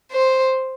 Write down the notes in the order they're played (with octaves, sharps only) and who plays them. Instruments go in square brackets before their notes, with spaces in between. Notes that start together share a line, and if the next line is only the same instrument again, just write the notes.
[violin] C5